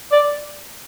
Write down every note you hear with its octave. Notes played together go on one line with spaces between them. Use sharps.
D5